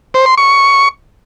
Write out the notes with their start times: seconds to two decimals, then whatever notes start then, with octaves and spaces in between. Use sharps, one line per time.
0.14 C5
0.26 C6
0.38 C#6